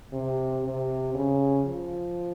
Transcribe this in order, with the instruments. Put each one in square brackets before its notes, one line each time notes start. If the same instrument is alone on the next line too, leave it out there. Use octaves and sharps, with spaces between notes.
[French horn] C3
C3
C#3
F3